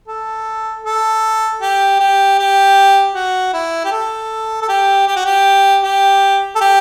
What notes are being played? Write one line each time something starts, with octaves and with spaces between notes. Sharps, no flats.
A4
A4
G4
G4
G4
F#4
E4
G4
A4
A4
G4
G4
F#4
G4
G4
A4
G4